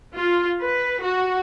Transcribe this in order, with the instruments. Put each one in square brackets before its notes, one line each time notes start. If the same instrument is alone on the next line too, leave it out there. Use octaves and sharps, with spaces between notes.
[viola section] F4
B4
F#4